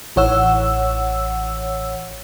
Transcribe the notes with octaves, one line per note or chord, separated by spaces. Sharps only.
A1 E3 C#5 F#5 E6